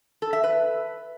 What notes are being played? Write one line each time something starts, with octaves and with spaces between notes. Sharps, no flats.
A4
E5
B4